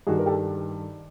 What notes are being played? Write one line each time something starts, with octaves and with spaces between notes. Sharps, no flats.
G2 D#3 F#4 G#4
A#4
G4 A4